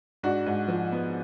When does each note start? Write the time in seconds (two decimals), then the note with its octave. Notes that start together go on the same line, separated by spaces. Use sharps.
0.23 G#2 D4 F#4
0.46 G#2
0.68 F3
0.92 B3